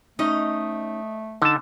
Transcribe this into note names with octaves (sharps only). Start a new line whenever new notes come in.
A3 C#4 D#4 D#5
D3 D#4 A5